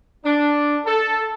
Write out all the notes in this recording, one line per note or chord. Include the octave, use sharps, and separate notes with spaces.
D4
A4